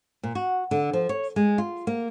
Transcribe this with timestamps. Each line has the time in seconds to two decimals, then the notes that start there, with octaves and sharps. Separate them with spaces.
0.23 A#2
0.35 F#4
0.71 D3
0.93 F3
1.09 C#5
1.36 G#3
1.58 F4
1.87 A#3